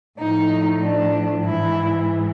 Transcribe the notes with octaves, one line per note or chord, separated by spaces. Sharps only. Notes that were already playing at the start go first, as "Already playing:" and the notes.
A2 F3 D#4
D4
G#2 E3 E4